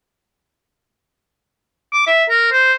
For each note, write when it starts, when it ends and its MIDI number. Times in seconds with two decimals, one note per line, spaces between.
1.93 2.06 86
2.07 2.24 76
2.29 2.48 70
2.52 2.73 72